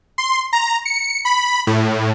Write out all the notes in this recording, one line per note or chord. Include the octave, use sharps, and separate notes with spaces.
C6
A#5
C#7
B5
A2